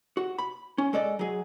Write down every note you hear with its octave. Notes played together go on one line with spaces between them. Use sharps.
F#4
B5
C#4
G#3 A4 D5 D#5
F#3 G#4